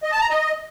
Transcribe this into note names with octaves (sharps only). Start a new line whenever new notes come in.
D#5
A5
A#5
D#5